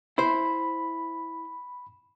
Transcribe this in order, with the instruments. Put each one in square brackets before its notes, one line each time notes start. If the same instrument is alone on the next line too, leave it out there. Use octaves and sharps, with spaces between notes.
[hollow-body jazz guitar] E4 C5 [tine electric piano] B5